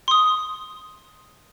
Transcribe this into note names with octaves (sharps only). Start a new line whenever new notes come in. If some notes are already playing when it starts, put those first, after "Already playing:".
C6 D#6